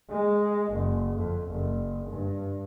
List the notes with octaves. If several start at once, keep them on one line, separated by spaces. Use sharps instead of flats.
G#3
F#1
F2
F#1
G2